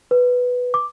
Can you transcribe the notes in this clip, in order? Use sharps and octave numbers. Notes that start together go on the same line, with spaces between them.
B4
D6